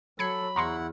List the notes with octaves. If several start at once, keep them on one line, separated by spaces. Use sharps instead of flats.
F#3 A4 B5 G#6 C7 C#7
E2 E4 F#5 A#5 C6 C#6